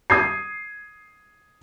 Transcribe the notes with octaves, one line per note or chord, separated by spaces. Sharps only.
D#6 G#6 C7